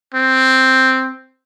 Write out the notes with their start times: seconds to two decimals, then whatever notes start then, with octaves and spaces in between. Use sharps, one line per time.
0.14 C4